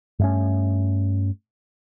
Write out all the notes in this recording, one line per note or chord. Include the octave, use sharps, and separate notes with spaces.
G2 A3 C#4